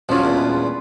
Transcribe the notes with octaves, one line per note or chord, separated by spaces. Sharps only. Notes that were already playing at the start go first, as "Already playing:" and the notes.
D#1 F3 F#3 C#4 D4 F4
E2 A#2
G#3 B4